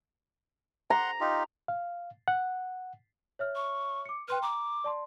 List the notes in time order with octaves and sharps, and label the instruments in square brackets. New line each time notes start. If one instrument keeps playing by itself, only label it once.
[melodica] F#5 C6 [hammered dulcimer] A#5
[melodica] D#4 F4 G4
[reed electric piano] F5
F#5
[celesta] C#5 E5 F6
[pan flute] C#6
[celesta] D6 C#7
[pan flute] B4 [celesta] G5 C6 F6
[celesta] A#5 [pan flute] D6
[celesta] D5 A5 C6